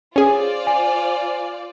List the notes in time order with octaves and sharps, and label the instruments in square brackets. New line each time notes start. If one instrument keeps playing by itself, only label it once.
[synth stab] C#4 G#4 [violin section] F4 C5 D5
[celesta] G#5